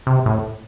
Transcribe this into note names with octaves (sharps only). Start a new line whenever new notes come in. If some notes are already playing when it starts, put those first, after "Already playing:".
C3
A2